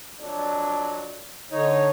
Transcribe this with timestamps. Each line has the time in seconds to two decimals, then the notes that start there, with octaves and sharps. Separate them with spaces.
0.20 F2 F#3 D4
1.52 D3 D#4 C#5